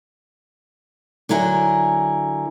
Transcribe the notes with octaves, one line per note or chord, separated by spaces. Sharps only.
D3 F#3 E4 A#4 G#5